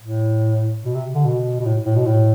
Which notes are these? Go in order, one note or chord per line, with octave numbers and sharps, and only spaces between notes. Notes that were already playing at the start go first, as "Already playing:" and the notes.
A2
B2
C3
D3
B2
B2
A2
A2
B2
A2